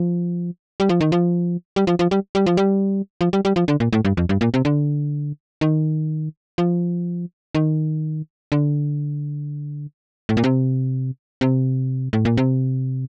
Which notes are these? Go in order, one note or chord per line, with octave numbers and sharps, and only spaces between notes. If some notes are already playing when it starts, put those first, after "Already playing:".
Already playing: F3
G3
F3
D#3
F3
G3
F3
F3
G3
G3
F3
G3
F3
G3
G3
F3
D3
A#2
A2
G2
F2
G2
A#2
C3
D3
D#3
F3
D#3
D3
A2
A#2
C3
C3
A2
A#2
C3